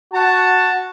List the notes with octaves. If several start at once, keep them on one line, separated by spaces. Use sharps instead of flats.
F#4 A5